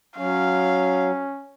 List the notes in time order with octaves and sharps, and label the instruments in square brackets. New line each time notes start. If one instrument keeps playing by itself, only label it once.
[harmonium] F#3 [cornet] C#4 [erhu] F5